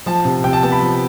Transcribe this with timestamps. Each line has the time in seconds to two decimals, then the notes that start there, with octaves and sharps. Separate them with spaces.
0.06 F3 A5
0.25 C3
0.44 C3 G5
0.53 A5
0.63 B3 A5
0.72 B5
0.82 F3